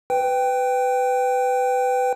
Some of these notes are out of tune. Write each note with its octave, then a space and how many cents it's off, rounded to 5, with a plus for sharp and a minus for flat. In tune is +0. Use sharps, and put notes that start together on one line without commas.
B4 +20 G5 +0